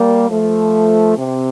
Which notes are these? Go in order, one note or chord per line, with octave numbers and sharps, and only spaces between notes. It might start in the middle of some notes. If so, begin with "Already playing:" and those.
Already playing: G3 A#3
F3 A3
C3